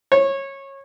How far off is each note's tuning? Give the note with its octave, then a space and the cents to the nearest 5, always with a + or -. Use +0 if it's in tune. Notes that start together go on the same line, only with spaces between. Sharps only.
C#5 -20